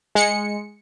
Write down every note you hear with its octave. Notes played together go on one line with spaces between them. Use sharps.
G#3 C#7